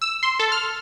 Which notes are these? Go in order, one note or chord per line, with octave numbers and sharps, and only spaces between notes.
E6
C6
A4
F6